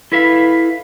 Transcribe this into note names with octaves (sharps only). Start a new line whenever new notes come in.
E4 A4 B4 E5 F5